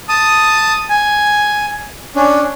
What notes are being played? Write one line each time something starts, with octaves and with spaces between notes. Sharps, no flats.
A5 D#6
G#5
C#4 D4